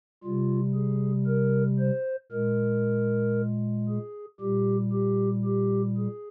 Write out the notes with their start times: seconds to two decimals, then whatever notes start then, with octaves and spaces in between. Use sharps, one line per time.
0.23 C3 G3 F4
0.75 G#4
1.27 A#4
1.79 C5
2.32 A#2 G#3 A#4
3.89 G#4
4.40 A#2 G3 G4
4.93 G4
5.45 G4
5.98 G#4